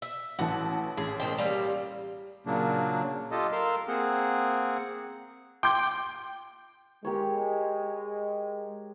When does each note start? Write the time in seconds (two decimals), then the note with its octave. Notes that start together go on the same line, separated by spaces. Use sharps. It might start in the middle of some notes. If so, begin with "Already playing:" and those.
0.02 E5
0.39 A1 E3 F#4 A5
0.97 A1 G#4
1.20 D#3 C5 G5
1.38 G3 A#3
2.46 A#2 C#3 F#3 A#3 D4
3.31 F4 G4 A4 D#5
3.52 A#4 F5 C6 E6
3.88 A#3 C4 G#4 F#5
5.63 G5 C6 D6 G6
7.05 G#3 G4 A#4 C#5